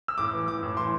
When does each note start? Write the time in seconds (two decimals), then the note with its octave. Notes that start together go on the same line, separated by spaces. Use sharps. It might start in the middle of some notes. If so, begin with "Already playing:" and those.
0.08 E6
0.18 A2 D6
0.33 E3
0.48 E3 D6
0.63 A2
0.77 E3 C6